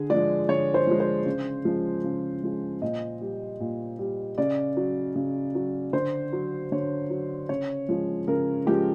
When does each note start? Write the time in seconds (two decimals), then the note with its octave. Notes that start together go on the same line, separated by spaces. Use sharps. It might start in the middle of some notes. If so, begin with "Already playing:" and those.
Already playing: D3 G#4
0.10 F3 G#3 D5
0.49 D3 C#5
0.74 C5
0.87 F3 G#3
1.00 C5
1.26 C#3
1.65 F3 G#3
2.04 C#3
2.43 F3 G#3
2.82 A#2 D#5
3.21 G3
3.60 A#2
3.99 G3
4.38 C#3 D5
4.77 F#3
5.16 C#3
5.55 F#3
5.93 D3 C5
6.33 F#3
6.72 D3 C#5
7.10 F#3
7.49 C#3 C#5
7.89 F3 G#3
8.28 C#3 A#4
8.66 F3 G#3 G4